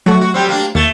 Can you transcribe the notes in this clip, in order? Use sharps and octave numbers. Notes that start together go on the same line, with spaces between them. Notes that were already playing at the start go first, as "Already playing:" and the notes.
F#3 A3 F#4
F#4
G3 C4
A#3 D4
D#2 A3 A6